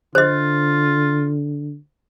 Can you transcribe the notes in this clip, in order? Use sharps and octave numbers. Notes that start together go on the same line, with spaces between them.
D3 F4 C5 D#5